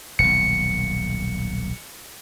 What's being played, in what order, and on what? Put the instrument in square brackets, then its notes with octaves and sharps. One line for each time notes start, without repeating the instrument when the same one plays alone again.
[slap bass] D#1 B1 [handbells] C#7